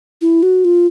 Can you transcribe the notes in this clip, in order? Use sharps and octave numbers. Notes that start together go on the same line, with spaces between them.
E4
F#4
F4